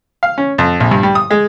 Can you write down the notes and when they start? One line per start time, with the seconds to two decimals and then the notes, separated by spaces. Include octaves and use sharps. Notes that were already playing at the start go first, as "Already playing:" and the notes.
0.23 F5
0.38 C#4
0.58 F2
0.80 A#1
0.91 G2
1.03 G3
1.15 D#6
1.30 G#3